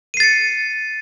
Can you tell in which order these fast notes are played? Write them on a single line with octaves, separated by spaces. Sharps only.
D#7 C7 A6 C#7